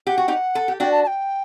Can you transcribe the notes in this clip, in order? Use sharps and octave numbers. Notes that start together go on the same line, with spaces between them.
G4 F#5
F#4
D#4 G4
A4
G4
D4 F#4 G5
A5
A5
G5